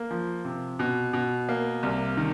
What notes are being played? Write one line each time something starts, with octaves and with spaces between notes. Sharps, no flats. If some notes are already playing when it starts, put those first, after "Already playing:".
Already playing: A#3
F3
C3
B2
B2
A#3
C2
D#3